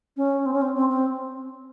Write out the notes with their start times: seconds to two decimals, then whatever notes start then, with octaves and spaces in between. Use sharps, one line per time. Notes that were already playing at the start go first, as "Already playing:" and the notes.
0.17 C#4
0.46 C4
0.54 C#4
0.62 C4
0.75 C4
0.90 C4